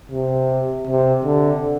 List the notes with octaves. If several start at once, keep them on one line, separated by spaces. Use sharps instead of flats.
C3
C3
D3